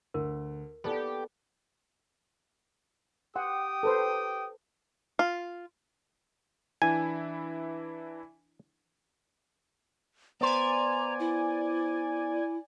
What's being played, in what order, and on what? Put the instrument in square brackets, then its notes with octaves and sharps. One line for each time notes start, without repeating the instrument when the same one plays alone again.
[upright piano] D2 [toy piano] A#4
[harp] B3 A4 [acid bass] G4 [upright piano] D5 G5
[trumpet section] G4 G5 D#6 [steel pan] F#5 C6
[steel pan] A4 B4 C5
[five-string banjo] F4
[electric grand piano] E3 D4 E4 [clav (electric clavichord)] G#5
[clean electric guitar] B3 C5 [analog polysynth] D5 G#5 [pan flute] A#5
[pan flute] E4